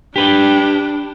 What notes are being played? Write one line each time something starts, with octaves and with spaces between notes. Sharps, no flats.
D4 G4 B4 G5